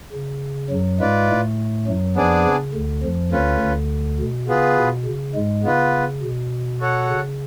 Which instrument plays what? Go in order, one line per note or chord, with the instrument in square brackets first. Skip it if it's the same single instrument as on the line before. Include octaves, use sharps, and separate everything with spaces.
[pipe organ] C#3
F#2 F#3
[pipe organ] G#2 G#3 [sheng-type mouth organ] F4 B4 D5
[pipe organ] A2 A3
F#2 F#3
[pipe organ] F2 F3 [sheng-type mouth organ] B3 D4 G#4 D5 G#5
[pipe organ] C#3
D2 D3
F2 F3
[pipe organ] D2 D3 [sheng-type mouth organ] C#4 F4 B4
[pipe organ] D2 D3
B2
[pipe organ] C#3 [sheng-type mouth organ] B3 F4 G#4 B4
[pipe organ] B2
C#3
G#2 G#3
[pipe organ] C#3 [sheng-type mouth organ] B3 F4 B4
[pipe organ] B2
[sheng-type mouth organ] F#4 A4 C#5 F#5
[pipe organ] C#3